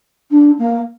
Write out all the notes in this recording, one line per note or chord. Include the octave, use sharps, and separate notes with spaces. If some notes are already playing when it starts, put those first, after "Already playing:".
D4
A#3